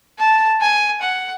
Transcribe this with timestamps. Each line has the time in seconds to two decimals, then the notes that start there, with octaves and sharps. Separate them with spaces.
0.19 A5
0.61 G#5
1.01 F#5